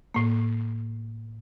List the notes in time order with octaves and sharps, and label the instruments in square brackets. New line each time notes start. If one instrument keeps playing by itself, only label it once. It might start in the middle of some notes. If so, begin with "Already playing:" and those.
[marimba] A2 A#3